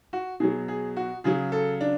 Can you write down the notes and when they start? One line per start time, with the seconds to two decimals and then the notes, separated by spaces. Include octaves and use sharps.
0.13 F#4
0.40 B2 F#3 G#4
0.68 G#4
0.96 F#4
1.24 C#3 F#3 G#4
1.52 A4
1.81 D4